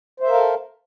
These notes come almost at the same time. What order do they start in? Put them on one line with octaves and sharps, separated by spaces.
C5 E5 A#4 F5 A4